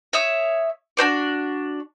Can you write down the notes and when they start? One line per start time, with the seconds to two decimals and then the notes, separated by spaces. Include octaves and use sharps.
0.13 C#5 E5 D#6
0.97 D4 F#4 C5 D5